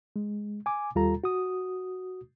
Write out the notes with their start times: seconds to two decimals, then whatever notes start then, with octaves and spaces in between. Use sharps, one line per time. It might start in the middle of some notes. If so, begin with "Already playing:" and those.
0.16 G#3
0.66 G#5 D6
0.95 D#2 G3 F4 A4 A#5
1.24 F#4 D#6